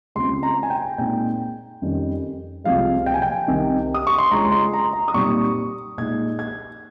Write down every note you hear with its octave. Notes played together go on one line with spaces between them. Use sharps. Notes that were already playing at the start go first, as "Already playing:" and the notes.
C#2 C#3 G#3 C4 C6
A#5
G#5
G5
A#2 G#3 C4 D#4 G5
F2 D#3 G3 C#4
C2 C3 F3 G#3 F5
G5
G#5
G5
C2 C3 D#3
D#6
C#6
C6
C#2 C#3 G#3 C#4 A#5
C6
A#5
A#5
D#6
A#2 G3 C4 D#4 C#6
A#2 G#3 D#4 G#6
G#6